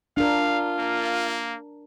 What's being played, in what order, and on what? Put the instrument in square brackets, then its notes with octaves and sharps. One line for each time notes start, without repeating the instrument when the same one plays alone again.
[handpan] D4 A#4 [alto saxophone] F4 [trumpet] F5
[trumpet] A#3